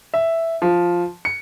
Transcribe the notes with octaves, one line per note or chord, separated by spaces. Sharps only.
E5
F3
C#7